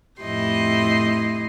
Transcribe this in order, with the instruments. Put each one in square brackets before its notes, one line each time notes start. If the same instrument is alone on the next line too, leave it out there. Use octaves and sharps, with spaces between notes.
[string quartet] F2 A2 E4 G4 D#5 C6